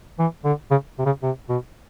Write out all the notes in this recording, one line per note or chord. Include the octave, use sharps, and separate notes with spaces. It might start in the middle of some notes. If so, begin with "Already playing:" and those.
E3
D3
C#3
C3
C#3
C3
B2